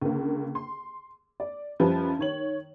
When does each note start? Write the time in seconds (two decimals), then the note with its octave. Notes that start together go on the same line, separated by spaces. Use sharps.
0.02 C#2 D3 A#3
0.55 C6
1.40 D5
1.80 F#2 F3 G3 G4 B4 A5
2.19 D#3 C#5 F#7